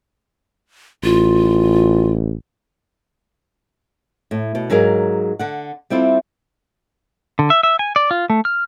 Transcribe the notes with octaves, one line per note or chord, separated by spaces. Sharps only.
A1 F4
A2
B2
G#2 F#3 G#4 A#4 F5
D3 F#5
G3 C4 E4 F4 A4
D3
E5
E5
G#5
D5
F4
A3
F6